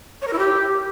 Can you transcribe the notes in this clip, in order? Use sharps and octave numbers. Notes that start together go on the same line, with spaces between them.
C#5
A#4
E4
G4